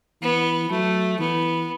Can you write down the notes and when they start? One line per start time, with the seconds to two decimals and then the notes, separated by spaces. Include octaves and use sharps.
0.22 E3 B3
0.71 F#3 A3
1.19 E3 B3